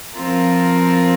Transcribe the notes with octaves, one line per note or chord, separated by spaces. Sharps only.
F3 C4 F4 A#4